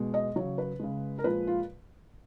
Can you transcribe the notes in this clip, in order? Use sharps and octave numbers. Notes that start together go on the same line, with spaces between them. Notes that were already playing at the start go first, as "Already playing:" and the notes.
Already playing: B2 G#3
D#5
C#3 F#3 C#5
B4
C#3 G#3
A#4
A#2 F3 G#3 B4
F4